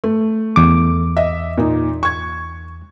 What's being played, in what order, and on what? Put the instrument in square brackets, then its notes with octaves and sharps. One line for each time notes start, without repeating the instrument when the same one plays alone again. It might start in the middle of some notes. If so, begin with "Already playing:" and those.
[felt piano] A3
[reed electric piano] E2 D6
[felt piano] D#5 E5
A#2 D#4
C#6 G#6